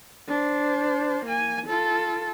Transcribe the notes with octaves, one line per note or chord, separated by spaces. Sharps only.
D4 C5
A#3 G#5
F4 A4